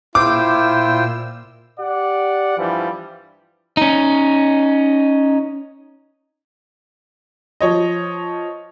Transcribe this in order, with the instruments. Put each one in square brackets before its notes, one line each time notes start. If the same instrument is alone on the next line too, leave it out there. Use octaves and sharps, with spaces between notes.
[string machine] A#2 E6 [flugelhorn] E4 [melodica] F4 C5 G5 [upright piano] D6
[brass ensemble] G4 D5 F#5
G2 E3 F3 G3
[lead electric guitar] C#4 D#4
[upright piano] F3 C#5 D#5